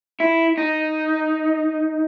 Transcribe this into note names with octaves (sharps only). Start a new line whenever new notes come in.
E4
D#4